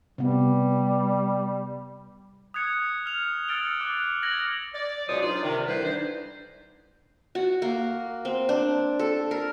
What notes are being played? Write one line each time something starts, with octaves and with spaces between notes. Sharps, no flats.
C3 G3 B3
D#6 F#6 G#6 C#7
F6 F7
E6 F6 A6 C#7 D7 G7
D6 F#6
F6 F#6 G#6 A#6 F#7
D5
C#2 B2 F#3 C5 C#5 D#6
D4 D#4 F4 D5
C3 D#3
D3 E3 G3 E4 B4 C5
D4 D#4 C5
F#4
A#3
C4
D4
A4
A#4